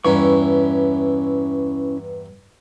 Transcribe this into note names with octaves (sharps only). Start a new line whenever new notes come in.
E2 G2 A#3 C#4 E4 C#6